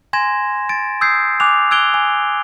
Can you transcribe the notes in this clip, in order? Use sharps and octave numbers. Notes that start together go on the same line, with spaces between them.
G#5 C6 G#6 A#6 E7
A6 D7
D#6 E6 G6 G#6 C7
G#5 D6 F#6 F7
E6 F#6 G#6 D7 F7 G7
G#5